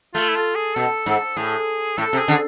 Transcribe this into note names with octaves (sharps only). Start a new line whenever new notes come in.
A3 F4
E4
F4
G#4
B2 A4
G#2
A2 G#4
A2 A4
C3
G#4
D3